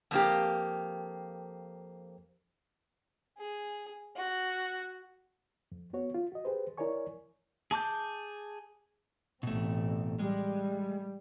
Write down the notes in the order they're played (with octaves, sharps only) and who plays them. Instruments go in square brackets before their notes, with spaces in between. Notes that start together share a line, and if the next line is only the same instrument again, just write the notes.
[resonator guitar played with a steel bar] F2 A#3 G4
[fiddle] G#4
F#4
[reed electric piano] F2
B3 F#4 C#5
F4
F#4 D#5
G4 G#4 B4 C5
E4 A#4 C#5 D5 G#5 C#6
[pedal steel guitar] G#4 A5 D6 G6
[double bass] A1 C4 [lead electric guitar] B2 A3
[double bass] G3 [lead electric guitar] G#3